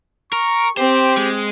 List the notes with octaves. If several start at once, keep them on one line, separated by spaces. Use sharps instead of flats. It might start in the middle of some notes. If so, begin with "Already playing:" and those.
A#4 C#6
C4 G4 C5
G#3